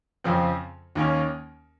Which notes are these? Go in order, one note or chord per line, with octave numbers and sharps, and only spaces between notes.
F2 C#3 F3 C4
D#2 D#3 A#3 C#4